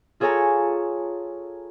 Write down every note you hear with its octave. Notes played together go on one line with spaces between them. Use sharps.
F4 G#4 A4 C#5 G#5 A#5